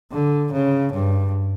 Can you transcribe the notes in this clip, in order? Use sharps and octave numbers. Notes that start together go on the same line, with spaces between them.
D3
C#3
G2